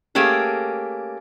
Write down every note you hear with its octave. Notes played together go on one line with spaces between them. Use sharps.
A3 A#3 C#4 G4 G#4